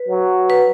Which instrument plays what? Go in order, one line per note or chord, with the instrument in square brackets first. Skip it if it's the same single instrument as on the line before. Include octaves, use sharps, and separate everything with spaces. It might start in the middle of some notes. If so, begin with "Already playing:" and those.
Already playing: [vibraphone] B4
[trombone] F#3
[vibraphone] B4